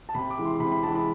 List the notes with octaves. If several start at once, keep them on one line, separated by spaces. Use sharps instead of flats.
A5
C3 B5
D6
E3 G#3
C6
C3 B5
B5
E3 G#3 A5
B5